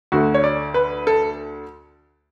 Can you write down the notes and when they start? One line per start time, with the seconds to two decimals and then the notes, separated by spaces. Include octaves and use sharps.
0.12 D2 D3 A3 F#4
0.34 C#5
0.44 D5
0.74 B4
1.07 A4